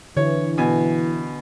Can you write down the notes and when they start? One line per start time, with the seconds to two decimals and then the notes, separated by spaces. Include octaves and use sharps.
0.17 D3 E3 C#5
0.58 B2 G#5